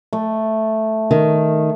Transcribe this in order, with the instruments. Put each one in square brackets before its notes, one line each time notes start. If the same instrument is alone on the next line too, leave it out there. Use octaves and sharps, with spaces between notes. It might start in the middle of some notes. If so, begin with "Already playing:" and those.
[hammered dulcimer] A3
[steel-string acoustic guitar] D#3